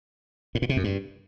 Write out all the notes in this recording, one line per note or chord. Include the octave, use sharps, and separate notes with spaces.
A2
A#2
C3
F#2
G2